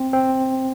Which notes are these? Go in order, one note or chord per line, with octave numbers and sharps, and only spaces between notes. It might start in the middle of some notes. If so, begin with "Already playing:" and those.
Already playing: C4
C4